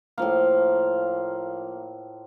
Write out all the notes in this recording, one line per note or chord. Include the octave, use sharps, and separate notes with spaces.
A2 F3 A#3 F5